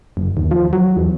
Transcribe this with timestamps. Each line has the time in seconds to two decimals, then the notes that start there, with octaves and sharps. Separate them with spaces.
0.17 F#1
0.37 D#2
0.51 F3
0.73 F#3
0.97 E2